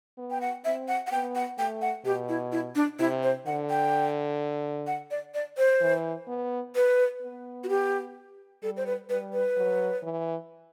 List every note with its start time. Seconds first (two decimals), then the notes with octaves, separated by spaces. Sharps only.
0.18 B3
0.31 G5
0.41 F#5
0.65 C4 E5
0.88 F#5
1.07 F#5
1.12 B3 G5
1.35 F#5
1.58 A3 G5
1.82 F#5
2.05 B2 G4
2.29 E4
2.52 E4
2.75 D4
2.99 C3 E4
3.23 C5
3.46 D3 F#5
3.70 G5
4.87 F#5
5.11 D5
5.34 D5
5.58 C5
5.81 E3
6.28 B3
6.75 B4
7.22 B3
7.64 F#4
7.69 G4
8.63 G3 A4
8.77 C5
8.87 B4
9.09 G3 B4
9.33 B4
9.57 F#3
10.03 E3